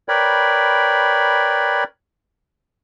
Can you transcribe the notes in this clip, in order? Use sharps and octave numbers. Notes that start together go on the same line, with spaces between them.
A#4 B4 C#5 D5 G5 B5